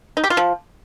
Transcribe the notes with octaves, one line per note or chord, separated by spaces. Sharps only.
D#4
G4
F4
F3